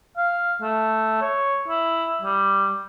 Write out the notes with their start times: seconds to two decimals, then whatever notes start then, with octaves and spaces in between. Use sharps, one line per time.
0.18 F5
0.62 A3
1.22 C#5
1.68 E4
2.22 G3